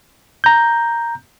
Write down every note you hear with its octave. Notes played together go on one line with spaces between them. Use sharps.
A#5 G6